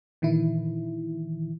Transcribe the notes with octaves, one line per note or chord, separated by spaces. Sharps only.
A#2 D#3 E3 E4